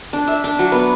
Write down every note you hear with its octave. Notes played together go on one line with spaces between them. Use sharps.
D4
E5
D4
F#3
B3